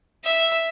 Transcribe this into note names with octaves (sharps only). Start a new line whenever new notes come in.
E5